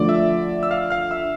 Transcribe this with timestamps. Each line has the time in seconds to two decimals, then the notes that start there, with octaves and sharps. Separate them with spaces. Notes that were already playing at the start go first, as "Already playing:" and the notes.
Already playing: D3 F3 A3 D5 D6
0.09 E5 E6
0.63 E6
0.71 F5 F6
0.91 F5 F6
1.11 E5 E6